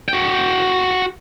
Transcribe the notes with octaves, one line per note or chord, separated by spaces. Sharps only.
F#4 G5